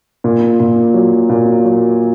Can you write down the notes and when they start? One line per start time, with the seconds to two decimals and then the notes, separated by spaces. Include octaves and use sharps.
0.24 A#2
0.60 A#2
0.94 F#3
1.29 A#2
1.64 F#3